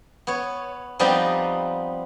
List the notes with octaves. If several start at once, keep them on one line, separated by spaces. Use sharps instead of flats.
B3 C#5
F3 G3 B3 C4 D#4 D#5